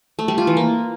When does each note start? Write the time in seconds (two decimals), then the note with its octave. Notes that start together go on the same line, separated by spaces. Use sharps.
0.19 A3
0.28 G3
0.38 F4
0.47 E3
0.57 A#3